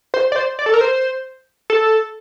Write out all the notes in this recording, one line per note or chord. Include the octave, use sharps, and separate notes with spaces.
C5
D5
C5
D5
A4
A#4
C5
A4